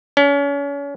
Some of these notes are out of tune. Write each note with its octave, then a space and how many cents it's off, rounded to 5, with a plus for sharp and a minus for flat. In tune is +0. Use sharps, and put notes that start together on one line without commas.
C#4 +35